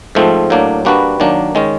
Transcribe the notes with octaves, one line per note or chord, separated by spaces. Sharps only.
G#2 F3 A3 C4
A2 F#3 A#3 D4
G3 A#3 D4 F#4 B4
D#3 F#3 A#3 D4
D#3 G#3 C#4